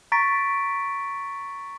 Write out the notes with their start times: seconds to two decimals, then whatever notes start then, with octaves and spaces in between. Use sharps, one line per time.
0.12 A#5 C#6 A6 B6 D7